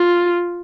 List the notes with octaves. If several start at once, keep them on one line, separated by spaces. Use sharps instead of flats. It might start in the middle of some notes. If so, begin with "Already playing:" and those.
Already playing: F4